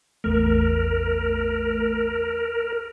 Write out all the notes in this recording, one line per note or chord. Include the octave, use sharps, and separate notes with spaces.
A1 E2 A3 A#4